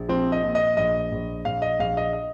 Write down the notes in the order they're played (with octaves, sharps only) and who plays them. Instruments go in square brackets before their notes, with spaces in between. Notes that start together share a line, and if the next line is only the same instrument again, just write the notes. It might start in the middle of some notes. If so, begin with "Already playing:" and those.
Already playing: [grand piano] A#1
F3 C4
D#5
A#2
D#5
A#1 D#5
A#1
A#1 F5
D#5
A#1 F5
D#5
D#5